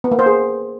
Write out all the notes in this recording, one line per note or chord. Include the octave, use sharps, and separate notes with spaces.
B3
A#3
C5
G#4